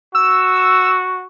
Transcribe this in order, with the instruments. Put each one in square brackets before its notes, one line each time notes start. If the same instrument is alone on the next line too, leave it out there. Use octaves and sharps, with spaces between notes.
[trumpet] F#4 [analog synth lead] E6